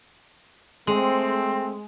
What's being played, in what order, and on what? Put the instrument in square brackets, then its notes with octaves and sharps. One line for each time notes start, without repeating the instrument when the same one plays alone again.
[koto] G#3 [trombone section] A3 C4